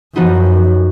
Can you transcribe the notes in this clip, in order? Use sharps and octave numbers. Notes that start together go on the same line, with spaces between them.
F#2 F3 B3 D#4 F#4